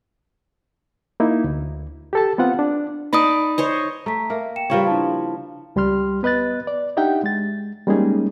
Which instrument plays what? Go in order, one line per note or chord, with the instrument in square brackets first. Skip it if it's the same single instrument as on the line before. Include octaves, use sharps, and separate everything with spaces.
[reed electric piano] A#3 D#4 E4
D2
G4 A4 A5
B3 C4 F4 F#5
D4
[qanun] D#4 D5 A5 [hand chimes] B5 D#6
[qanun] C5 C#5 D#5
[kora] A3 [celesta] A#5 B6
[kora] A#3 A#4 [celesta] E5
[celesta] G5 C#7 E7
[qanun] C#3 F3 B4 [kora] G3 A#4 C#5
[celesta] D4 E4 A5
[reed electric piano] C#2 G3 G4 C6 F6
B3 B4 D#5 F#6 A6
D5
D4 D#4 G4 E5 F#5 G5
G#3 A6
G3 G#3 A#3 C#4 D#4 G#4